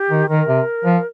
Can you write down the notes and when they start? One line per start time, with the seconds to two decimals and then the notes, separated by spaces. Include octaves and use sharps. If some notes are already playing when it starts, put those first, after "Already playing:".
Already playing: G4
0.10 D#3
0.29 D#3 A#4
0.47 C3
0.85 F3